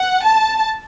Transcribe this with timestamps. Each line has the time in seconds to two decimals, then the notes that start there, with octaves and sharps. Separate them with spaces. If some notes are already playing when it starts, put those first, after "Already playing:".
Already playing: F#5
0.24 A5